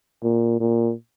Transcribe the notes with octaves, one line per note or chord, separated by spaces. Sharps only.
A#2
A#2